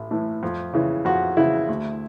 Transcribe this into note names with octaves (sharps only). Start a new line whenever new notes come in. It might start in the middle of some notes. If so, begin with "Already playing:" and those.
Already playing: A1 A2
A2 E3
F2
C#3 E3
F2 F#4
C#3 E3 E4
D2